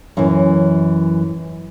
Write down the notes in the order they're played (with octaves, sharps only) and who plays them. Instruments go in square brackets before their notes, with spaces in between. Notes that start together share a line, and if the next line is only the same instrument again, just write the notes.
[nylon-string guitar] F#2 E3